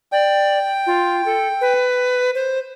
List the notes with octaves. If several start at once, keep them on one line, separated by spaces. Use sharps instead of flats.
D5 G5
F4
A4
B4
C5